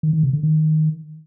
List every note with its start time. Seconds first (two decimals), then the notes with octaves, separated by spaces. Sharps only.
0.03 D#3
0.13 D#3
0.23 C3
0.33 D3
0.43 D#3